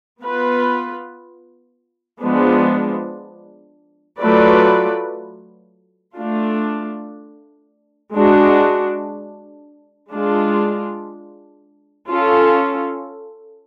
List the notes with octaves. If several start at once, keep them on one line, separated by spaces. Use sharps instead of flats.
B3 F4 B4
F3 G#3 B3 D4
F#3 A3 F4 B4 D5
A3 D4 F4
G#3 D4 F#4
G#3 D4 F4
C#4 F4 A4